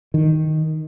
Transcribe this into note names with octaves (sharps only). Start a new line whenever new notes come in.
D#3